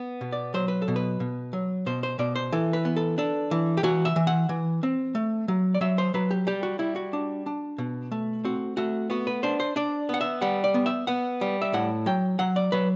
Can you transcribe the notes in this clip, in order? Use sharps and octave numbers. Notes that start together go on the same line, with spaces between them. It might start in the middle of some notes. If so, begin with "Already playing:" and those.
Already playing: B3
B2
D5
F#3 C5
B4
A4
B2
B4
B2
F#3
B2 C5
C5
B2 D5
C5
E3 A4
B4
B3
A4
D4 A4
E3
G4
E3 F#4
E5
E3
F#5
E3
C4
A3
F#3
D5
F#3 E5
C5
F#3 B4
G4
G3 G4
F#4
G3 E4
F#4
D4
D4
B2
A3
C4 F#4
A3 F#4
B3 F#4
B4
D4 C5
C5
D4 D5
B3 F#5
E5
G3 F#5
D5
B3
E5
B3 F#5
G3
E5
A2 F#5
F#3 G5
F#3 F#5
D5
F#3 B4